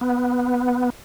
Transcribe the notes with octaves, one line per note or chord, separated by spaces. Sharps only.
B3